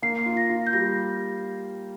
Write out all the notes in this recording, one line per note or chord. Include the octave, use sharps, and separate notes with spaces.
A#3 C7
F4
A#6
F4
G6
G3 A#6